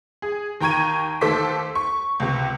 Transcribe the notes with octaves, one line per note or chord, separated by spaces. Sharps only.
G#4
D#2 G5 A#5 C#6 G#6 D#7
D#2 A3 A4 C5 D6 B6
C#6
C#2 C3